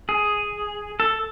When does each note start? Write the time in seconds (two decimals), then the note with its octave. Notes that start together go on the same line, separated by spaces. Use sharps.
0.09 G#4
1.00 A4